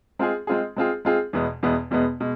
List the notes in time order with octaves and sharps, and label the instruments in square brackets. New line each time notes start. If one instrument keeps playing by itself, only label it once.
[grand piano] G#3 C4 F4 G#4
G#3 C4 F4 G#4
G#3 C4 F4 G#4
G#3 C4 F4 G#4
E2 B2 G#3 B3
E2 B2 G#3 B3
E2 B2 G#3 B3
B2 G#3